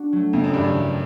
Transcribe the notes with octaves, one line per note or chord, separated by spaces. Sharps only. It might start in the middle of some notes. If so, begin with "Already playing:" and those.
Already playing: D4 F#4
F#3 A3
F2 C#3
F#2
G2 E3 G3
F#2
E3